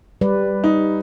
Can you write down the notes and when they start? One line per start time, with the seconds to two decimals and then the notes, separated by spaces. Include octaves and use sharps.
0.21 G3 B4 D5
0.64 D#4